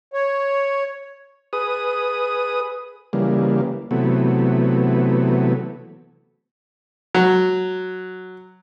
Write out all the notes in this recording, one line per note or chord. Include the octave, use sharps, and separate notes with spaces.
C#5
G#4 B4 D#6
C#3 E3 G3 A#3
C3 E3 F#3 A3 B3
F#3